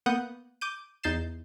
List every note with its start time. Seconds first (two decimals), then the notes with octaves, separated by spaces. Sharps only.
0.06 A#3 B3 F#5 D#6 G6
0.61 D6 G6 D#7
1.03 E2 D#4 G6 A6 C7 E7